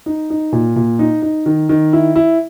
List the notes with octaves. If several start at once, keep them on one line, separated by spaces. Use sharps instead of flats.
D#4
D#4
A#2
A#2
D#4
D#4
D#3
D#3
E4
E4